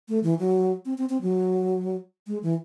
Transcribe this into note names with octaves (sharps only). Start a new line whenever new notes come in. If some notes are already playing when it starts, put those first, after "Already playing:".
A3
E3
F#3
C4
C4
C4
F#3
G#3
E3